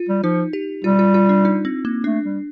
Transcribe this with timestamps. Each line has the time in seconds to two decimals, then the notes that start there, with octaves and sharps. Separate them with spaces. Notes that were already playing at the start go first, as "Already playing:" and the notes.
Already playing: F4
0.09 G3
0.23 F3 D#4
0.53 G4
0.84 G3 F4
0.99 F4
1.14 F4
1.29 D4
1.45 D#4
1.65 C4
1.85 A#3
2.04 A3 D4
2.25 G3